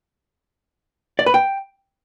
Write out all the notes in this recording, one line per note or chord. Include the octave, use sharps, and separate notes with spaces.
D5
B4
G5